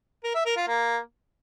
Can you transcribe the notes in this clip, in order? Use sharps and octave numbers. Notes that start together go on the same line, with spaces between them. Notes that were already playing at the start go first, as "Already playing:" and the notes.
A#4
E5
A#4
F4
A#3